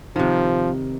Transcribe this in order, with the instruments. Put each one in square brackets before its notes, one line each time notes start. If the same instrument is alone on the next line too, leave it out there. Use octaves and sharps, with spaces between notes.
[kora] C3 D#3 [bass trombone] F3